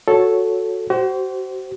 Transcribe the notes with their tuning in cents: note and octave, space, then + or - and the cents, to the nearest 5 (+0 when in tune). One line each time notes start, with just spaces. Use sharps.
F#4 -15 A4 +0 C#5 +0
F#4 +40 C5 +0